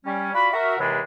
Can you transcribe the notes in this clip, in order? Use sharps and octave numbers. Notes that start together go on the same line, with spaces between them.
G3 C#4
F4 F#4 D5 B5
F#4 A#4 E5
D#2 C3 E3 G#3 D4 B5